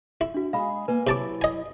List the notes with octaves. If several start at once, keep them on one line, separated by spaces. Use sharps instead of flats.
E4
D4 F#4
G#3 G#4 F5 B5
A#3 B4 G#5
C3 F#3 E4 A5 D6
D#5 G#5